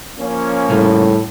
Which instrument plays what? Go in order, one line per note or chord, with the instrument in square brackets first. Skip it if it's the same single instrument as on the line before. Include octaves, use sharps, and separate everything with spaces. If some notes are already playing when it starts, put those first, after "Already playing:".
[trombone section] F3 A#3 C#4
[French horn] A2 [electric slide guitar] C#3 G3 D#4